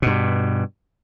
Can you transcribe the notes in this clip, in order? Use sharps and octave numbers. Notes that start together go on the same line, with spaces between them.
G2 B2